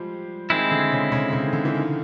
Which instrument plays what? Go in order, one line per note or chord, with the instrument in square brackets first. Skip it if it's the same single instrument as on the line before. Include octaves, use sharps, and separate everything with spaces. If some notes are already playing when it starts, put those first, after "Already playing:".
Already playing: [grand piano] F3 G3 G#3
[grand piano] D#3 [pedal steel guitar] G#3 C4 E4
[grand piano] D3
C#3
C#3
C#3
D#3
D3
E3
D#3